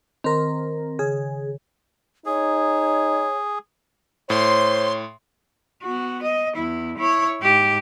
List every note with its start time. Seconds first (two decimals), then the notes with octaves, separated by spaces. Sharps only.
0.24 D#3 C4 A#4 C6
0.99 C#3 G#4
2.26 D#4 G#4 C#5
4.30 A2 C5 C#5 C6
5.82 B3 F#4
6.22 D#5
6.56 E2 E4
6.98 E4 C#5
7.42 G#2 G4